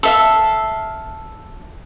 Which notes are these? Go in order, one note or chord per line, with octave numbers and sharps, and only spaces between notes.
A4 E5 F5